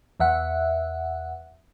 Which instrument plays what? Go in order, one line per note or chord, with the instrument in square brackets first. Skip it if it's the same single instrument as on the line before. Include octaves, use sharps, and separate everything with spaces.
[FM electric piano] E2 E5 F#5